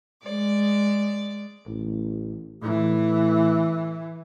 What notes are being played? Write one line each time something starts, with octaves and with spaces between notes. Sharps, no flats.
G#3 D5
A1
A2 E3